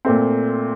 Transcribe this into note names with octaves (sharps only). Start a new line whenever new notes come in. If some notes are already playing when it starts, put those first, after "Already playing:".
A#2 A3 C4